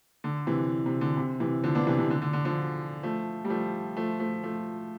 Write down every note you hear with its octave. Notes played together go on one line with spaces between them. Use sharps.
D3
C3 E3
C3
D3
C3
C3 E3
D3 F3
B3 D4
C3 E3
C3
D3
D3
D3
D3 F3
F3 A3
G3
F3 A3
F3 A3
F3 A3
F3 A3